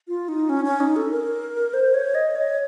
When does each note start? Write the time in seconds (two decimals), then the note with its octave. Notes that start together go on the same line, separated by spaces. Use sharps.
0.08 F4
0.28 D#4
0.49 C#4
0.65 C#4
0.80 D#4
0.96 A4
1.11 A#4
1.74 C5
1.94 C#5
2.15 D#5
2.35 C#5